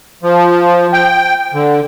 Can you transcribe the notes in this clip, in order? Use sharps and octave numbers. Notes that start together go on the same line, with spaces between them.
F3
G5
D3